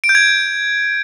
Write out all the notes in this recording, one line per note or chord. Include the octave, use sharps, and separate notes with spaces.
D7
G6
G#6